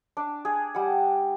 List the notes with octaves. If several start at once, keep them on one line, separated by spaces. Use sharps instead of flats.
D4
G#4
G3 F#5